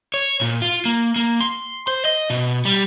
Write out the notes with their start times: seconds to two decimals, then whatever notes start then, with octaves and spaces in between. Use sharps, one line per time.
0.14 C#5
0.41 A#2
0.62 F4
0.85 A#3
1.16 A#3
1.41 C6
1.88 C5
2.05 D#5
2.30 B2
2.65 G3